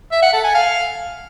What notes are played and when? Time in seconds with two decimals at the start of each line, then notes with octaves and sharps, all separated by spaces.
0.12 E5
0.23 F#5
0.33 A4
0.44 G#5
0.55 F5